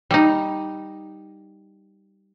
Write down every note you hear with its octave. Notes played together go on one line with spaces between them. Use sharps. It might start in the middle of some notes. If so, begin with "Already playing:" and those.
G3 D#4